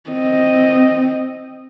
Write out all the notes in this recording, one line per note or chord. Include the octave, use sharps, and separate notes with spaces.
C4 D#5